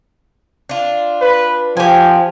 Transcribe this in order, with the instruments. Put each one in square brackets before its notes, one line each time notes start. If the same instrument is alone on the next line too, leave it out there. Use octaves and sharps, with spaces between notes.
[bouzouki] D4 F4
[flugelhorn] B4
[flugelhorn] F3 [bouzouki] G4 G#5